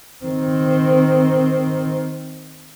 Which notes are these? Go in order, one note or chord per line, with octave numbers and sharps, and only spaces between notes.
D#3 C4